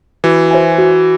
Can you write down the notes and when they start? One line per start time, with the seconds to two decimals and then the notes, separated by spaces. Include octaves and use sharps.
0.24 E3 F#4
0.51 C5 E5 G#5
0.78 F#4